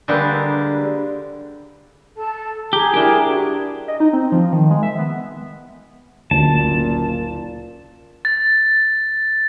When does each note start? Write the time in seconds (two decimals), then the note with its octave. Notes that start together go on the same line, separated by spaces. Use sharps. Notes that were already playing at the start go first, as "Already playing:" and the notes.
0.08 D3 G3 G#3 A#3 G4 B4
2.16 A4 A5
2.73 G4 G#4 A#5
2.94 G3 D4 E4 G4 A#4
3.27 E4 F#4
3.88 D#5
4.00 D#4
4.13 C4
4.32 F3
4.52 D#3
4.71 G#3
4.83 E5
4.98 B3
6.31 F#1 D2 A#2 A5
8.25 A6